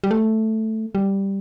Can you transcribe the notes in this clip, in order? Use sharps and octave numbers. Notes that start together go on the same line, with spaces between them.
G3
A3
G3